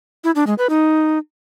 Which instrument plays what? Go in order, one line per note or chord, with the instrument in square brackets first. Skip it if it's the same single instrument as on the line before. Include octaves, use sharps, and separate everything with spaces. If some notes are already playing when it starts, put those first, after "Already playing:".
[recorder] E4
D4
G#3
B4
D#4